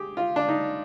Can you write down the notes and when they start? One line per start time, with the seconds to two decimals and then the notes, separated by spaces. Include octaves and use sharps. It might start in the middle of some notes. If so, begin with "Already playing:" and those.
Already playing: G4 G#4
0.17 F4
0.36 D4
0.48 D#4